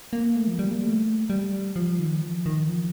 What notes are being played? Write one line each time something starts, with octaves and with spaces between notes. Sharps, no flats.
A#3
A3
F3
G3
A#3
A3
G3
F3
D#3
F3
D#3
F3